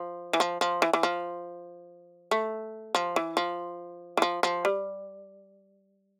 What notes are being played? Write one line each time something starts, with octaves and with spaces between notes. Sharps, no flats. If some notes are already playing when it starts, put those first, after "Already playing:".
Already playing: F3
E3
F3
F3
E3
E3
F3
A3
F3
E3
F3
E3
F3
F3
G3